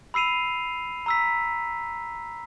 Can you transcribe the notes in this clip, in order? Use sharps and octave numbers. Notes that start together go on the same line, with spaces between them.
B5 E6 C7 D#7 F7
A#5 E6 B6